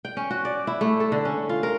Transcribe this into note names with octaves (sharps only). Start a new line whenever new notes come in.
G5
C#4
F#4
D5
E4
A3
A4
D3
C#4
F4
A#4